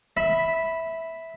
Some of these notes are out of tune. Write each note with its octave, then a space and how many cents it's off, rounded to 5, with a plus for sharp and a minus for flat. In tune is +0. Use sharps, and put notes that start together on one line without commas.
E5 -10 B5 +0